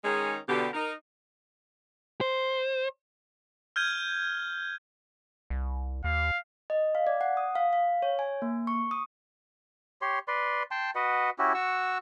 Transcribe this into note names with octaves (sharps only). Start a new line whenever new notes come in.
D#3 G#3 C#4 D#4 G#4 C#5
B2 D3 G4
D#4 A#4
C5
F6 G6 G#6 D#7 G7
C2
D#2 F5
D#5
F5
D5
F#5
D#6
F5
F5
C#5
G#5
A#3
C#6
D#6
G4 C#5 C6
B4 D5 C6
G5 A5 C6
F#4 B4 D#5 F#5
C#4 E4 F#4 G4
F#4 F#5 C#6 E6